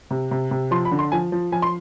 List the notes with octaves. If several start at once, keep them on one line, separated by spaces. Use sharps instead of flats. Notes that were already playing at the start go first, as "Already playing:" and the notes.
C3
C3
C3
F3 C6
B5
D3
C6
F3 G#5
F3
F3 G#5
C6